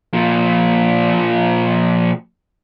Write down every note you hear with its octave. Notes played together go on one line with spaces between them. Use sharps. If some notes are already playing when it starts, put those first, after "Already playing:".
A#2 F3